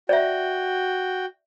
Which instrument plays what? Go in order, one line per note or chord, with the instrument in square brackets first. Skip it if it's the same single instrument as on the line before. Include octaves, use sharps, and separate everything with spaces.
[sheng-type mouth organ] F#4 G5 [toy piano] D5 E5